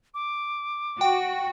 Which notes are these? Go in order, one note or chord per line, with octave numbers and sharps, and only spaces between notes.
D6
F#4 G5